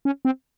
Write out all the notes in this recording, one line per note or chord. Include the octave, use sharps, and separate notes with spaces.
C#4
C4